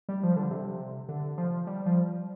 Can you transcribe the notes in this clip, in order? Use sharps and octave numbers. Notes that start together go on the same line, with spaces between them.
G3
F3
D3
C3
D3
F3
G3
F3